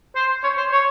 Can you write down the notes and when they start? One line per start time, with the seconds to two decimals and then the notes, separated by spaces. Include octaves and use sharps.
0.15 C5
0.43 C#5
0.57 C5
0.72 C#5